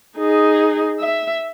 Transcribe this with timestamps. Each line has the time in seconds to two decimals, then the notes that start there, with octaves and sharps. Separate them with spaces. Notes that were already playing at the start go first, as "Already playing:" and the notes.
0.17 D#4 G#4
0.99 E5